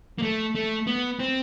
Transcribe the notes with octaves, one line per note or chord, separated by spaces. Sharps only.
A#3
A3
A3
B3
C4